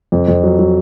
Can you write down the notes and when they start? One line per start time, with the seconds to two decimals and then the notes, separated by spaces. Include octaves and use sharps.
0.12 F2
0.28 F2
0.44 F#3
0.59 F#3